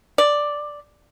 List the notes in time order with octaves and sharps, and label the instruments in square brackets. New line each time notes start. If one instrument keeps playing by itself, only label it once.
[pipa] D5